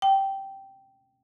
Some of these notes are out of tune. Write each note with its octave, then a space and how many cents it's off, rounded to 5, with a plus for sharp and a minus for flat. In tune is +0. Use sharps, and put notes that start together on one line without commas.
G5 -10